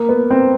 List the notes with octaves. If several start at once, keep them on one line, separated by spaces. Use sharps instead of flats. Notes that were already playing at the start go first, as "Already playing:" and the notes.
Already playing: A#3
B3
C4